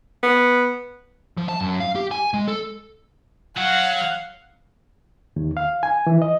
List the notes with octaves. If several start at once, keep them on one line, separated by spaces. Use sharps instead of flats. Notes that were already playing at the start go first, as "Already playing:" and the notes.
B3
F3
A5
F#2
F5
G4
G#5
G#3
A4
F#3 F5 F#5
D#2
F5
G#5
E3
D#5